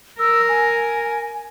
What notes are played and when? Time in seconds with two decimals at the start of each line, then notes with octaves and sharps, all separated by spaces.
0.19 A#4 E6
0.49 G#5